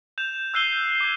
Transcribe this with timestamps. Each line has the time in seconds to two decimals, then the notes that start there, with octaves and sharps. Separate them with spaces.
0.18 G6 E7 F7
0.54 E6 F#6 G6 C7 D#7 G7
1.01 D6 G#6